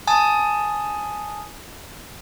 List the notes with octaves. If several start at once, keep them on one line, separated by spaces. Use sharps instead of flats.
G#5 A5 D#6